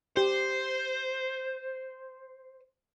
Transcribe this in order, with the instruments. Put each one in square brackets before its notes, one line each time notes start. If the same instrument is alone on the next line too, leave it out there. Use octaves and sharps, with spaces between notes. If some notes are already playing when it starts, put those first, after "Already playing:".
[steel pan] G4 [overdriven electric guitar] C5